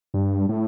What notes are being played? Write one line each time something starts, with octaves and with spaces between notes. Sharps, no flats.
G2
A2